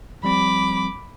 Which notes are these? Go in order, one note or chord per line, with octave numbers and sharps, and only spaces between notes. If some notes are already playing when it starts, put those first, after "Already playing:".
F3 G3 C4 B5 D6